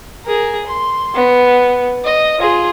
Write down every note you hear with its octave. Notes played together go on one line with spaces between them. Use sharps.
G#4 A#4
C6
B3
D#5
F4 G#4